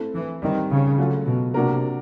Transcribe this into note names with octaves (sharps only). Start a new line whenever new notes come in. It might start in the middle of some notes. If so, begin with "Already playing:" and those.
Already playing: A3 C4 E4 A4
E3
D#3 G3 C4 D#4
C#3
F#3 A3 C#4 F4
B2
C3 A#3 D4 F#4 A#4